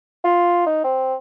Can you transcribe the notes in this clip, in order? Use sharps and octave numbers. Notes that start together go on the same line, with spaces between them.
F4
D#4
C4